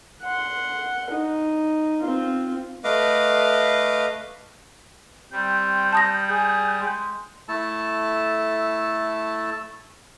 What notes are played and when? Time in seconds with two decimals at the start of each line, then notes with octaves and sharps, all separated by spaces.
0.23 F#5 C6
1.10 D#4
2.01 C4 F4
2.84 A3 B4 D#5 F5 D6
5.32 G3 C4 G6
5.93 A5 D#6 A#6
6.30 G#4
6.80 G#3
7.48 A3 E4 A4 A5